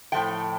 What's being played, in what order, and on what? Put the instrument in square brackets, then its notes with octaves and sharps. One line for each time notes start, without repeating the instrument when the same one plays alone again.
[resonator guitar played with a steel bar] A2 F3 A3 G5